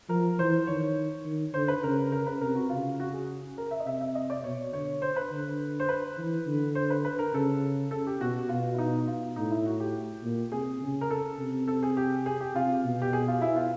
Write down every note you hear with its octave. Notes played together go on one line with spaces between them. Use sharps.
F3 A#4
E3 C5
D#3 C#5
D#3
D3 C5
B4
C#3 A#4
A#4
B4
C3 A#4
F#4
C#3 F4
F#4
G#4
A#4
E5
D#5
C3 E5
E5
D#5
D5
B2 C#5
D3 C#5
C5
B4
D3
C5
B4
E3
D3
C5
B4
B4
A#4
C#3 A4
A4
G4
B2 F#4
B2 F4
E4
D#4
F4
A2 D#4
E4
F#4
G4
A#2
C3 G#4
C#3
A#4
A4
C3
A4
G#4
G4
G#4
G4
C3 F4
B2
G4
G#4
F4
E4
F4